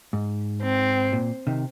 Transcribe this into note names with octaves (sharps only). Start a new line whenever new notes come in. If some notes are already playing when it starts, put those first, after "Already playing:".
G#2
C4
A#2
C3 D#3